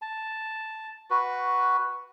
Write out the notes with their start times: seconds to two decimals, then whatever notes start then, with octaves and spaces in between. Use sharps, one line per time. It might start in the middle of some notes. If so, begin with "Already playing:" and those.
0.02 A5
1.10 F#4 B4